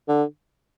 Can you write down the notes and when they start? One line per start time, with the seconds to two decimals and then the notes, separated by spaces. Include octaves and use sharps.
0.08 D3